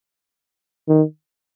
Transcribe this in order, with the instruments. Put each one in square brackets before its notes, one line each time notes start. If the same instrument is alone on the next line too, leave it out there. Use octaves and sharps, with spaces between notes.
[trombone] D#3